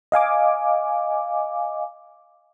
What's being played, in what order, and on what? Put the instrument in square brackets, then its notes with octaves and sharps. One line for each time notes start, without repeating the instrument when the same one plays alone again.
[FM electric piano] D#5 F5 G#5 D6